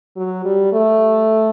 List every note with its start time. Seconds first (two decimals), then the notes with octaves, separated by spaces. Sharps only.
0.17 F#3
0.45 G3
0.73 A3